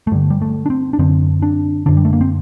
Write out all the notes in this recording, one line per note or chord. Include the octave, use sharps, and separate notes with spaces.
A3
G2 D3 G3
G3
A3
D4
C4
D4
F#2 D3 C4
D4
F#2 D3 D4
G3
A3
A#3
C4